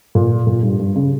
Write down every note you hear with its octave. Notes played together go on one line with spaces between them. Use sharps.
A#2
A#2
G2
G2
C#3